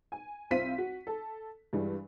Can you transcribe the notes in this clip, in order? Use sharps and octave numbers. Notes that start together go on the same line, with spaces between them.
G#5
C2 C4 F4 C5 B6 D#7
F#4
A4
G2 E3 G3 G#3